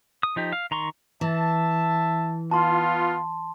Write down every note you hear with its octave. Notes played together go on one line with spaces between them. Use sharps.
D#6
F3 D#4 G4
F5
D#3 A#5 C6 C#6
E3 E5 A5
B3 F4 A5 C6